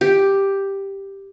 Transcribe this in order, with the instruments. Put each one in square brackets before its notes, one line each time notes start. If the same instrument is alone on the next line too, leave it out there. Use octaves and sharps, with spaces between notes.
[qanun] G4